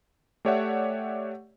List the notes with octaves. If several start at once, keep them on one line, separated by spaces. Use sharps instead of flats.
A3 G4 C#5 D5 E5 F#5